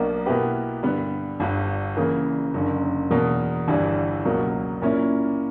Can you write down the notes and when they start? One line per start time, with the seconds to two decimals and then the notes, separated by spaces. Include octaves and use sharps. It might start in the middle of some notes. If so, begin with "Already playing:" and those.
Already playing: B1 B2 A#3 D4
0.26 B2 A#3 E4 G4 B4
0.83 G2 D3 G3 B3
1.40 G1 G2 D3
1.97 C#3 E3 A#3
2.54 F#1 F#2 D3
3.11 E2 B2 A#3
3.68 G1 G2 E3 G3
4.25 C#2 B2 F#3 A#3
4.82 A#2 A#3 C#4 E4